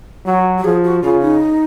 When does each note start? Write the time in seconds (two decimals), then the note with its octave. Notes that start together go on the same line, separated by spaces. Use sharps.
0.26 F#3 F#4
0.58 F#4
0.64 F3 G#4
0.84 F#4
1.03 C#3 F4
1.22 D#4